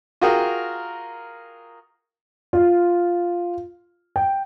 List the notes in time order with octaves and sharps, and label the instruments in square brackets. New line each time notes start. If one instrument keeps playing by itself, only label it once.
[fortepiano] F4 F#4 G#4 A#4 G5
[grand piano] F4
G5